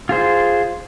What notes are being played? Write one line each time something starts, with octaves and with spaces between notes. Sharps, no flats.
F4 G#4 C5